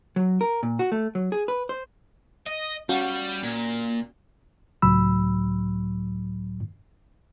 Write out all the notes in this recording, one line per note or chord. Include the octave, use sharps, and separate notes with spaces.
F#3
A#4
A#2
F#4
A3
F#3
G#4
B4
C5
D#5
G3 C#4 F#4 F5
A#2
C#2 A2 F#3 B5 E6